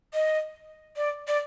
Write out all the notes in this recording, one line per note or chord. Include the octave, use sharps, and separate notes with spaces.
D#5
D5
D5